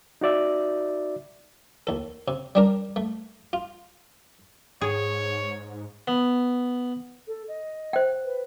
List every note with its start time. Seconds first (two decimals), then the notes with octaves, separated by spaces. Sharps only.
0.21 D#4 F#4 D5 E5
1.87 D#2 A4
2.28 C3
2.55 G3 D4 A#4
2.96 A3
3.53 F4
4.81 G#2 G#4 C#5
6.08 B3
7.27 A4
7.48 D#5
7.93 C5 G5
8.24 B4